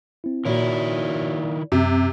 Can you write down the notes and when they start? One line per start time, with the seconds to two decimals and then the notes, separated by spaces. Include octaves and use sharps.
0.24 C4 E4
0.45 A#2 D#3 E4 F#4 C#5
1.72 F#2 C3